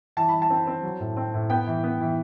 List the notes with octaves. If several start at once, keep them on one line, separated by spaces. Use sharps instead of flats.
E3 A5
E3 B5
A5
C4
C4
F#3
A2
C4
A2
B3 G5
E3
B3
E3